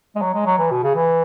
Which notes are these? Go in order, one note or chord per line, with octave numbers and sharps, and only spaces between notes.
G#3
F#3
G#3
F#3
E3
B2
C#3
E3